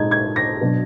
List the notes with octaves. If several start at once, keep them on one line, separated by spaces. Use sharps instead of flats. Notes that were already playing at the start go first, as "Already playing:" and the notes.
Already playing: A#2 G#3 D#4 G#6
G#6
A#6
B2 F#3 D4